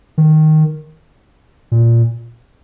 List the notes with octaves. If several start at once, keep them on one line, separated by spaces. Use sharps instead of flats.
D#3
A#2